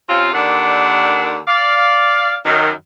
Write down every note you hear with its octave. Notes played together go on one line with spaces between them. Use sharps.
C3 C4 C#4 F4
D#2 D3 D#3 D4 D5 F#5
D5 F5
F#2 D#3